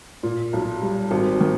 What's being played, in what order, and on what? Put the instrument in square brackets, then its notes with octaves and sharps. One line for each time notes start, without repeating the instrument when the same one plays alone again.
[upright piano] A#2
B1
G3
G#1
D#3